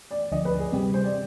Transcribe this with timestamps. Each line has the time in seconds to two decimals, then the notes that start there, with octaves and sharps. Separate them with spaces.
0.11 D5
0.32 D2 D3 F3 D#5
0.45 B4
0.60 G#4
0.72 C3 G3 C4 G4
0.94 C5
1.04 D5